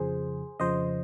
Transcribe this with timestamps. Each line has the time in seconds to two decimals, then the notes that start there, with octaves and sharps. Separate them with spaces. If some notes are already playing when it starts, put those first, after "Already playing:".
Already playing: F2 C#3 F3 G#4 C5
0.60 F2 C#3 F3 C5 D#5